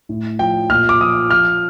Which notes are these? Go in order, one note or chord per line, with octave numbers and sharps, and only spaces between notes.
A2
F3 G5
A#2 F6
D6
F3 D#6
F3 F6